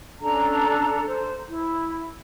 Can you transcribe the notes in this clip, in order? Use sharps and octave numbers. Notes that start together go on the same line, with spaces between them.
C#4 D4 A4 A#5
C5
E4